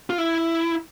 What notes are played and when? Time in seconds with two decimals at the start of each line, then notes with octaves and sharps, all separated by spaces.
0.10 F4
0.18 E4